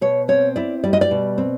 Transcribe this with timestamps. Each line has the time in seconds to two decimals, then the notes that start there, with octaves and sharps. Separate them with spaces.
0.01 B2 C#5
0.28 C4 C#5
0.56 E4 D5
0.84 G3 D5
0.93 D#5
1.01 D5
1.11 B2
1.38 C4